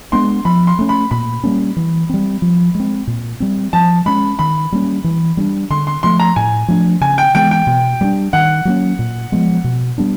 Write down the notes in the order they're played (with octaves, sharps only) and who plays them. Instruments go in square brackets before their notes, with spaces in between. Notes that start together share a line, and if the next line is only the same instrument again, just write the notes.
[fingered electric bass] G#3 B3 D4 [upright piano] C6
[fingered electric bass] F3 [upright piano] B5
[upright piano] C6
[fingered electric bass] A3 C#4
[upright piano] B5
[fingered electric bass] A#2 [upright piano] B5
[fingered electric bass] G3 A#3 C#4
E3
G3 C4
F3
G#3 C4
A#2
G3 C4
[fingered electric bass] F3 [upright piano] A5
[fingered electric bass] G#3 C#4 [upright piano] B5
[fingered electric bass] D#3 [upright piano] B5
[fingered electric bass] G3 A#3 C#4
E3
G3 B3 D4
[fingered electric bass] D3 [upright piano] C6
[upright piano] C6
[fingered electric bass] F3 A3 [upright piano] C6
[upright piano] A#5
[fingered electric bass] A2 [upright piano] G#5
[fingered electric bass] F3 A3 D4
[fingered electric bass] C#3 [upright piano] G#5
[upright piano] G5
[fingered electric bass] E3 G#3 B3 [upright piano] G5
[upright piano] G5
[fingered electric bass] B2
G3 B3 D4
[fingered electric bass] D#3 [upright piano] F#5
[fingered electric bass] F#3 A#3 C#4
A#2
F3 G#3 B3
B2
G3 B3 D4